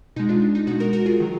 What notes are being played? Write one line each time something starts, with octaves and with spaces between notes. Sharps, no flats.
B2 G#3 D#4
D4 F4
D4
D#4
B2 G#3 D#4 F#4
F#4 A#4
F#4 A#4
F4 G#4
D#3 F#3